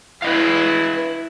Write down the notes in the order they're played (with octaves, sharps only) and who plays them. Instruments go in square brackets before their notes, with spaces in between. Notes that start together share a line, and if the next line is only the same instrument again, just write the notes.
[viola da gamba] E4 [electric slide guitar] B4 D#5 F5